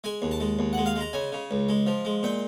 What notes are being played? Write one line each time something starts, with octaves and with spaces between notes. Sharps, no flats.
G#3 G#5
D#2
A5
G#3
D#2
G#3 F#5
F5
G#3 A#5
C#3 G#5
C#3
C#2
G#3
F3
G#3
A#2 G5